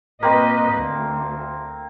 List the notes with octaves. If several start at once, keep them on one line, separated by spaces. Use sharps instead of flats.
A#2 A#3 C4 B4 D#5
D2